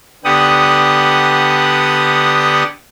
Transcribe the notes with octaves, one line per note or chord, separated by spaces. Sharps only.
D3 B3 G4 F#5 D#6